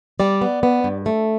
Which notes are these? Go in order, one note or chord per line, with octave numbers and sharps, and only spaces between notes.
G3 D5
B3
B3
G2
A3